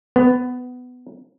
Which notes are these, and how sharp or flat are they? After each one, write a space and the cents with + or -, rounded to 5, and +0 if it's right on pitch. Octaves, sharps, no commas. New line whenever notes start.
B3 +15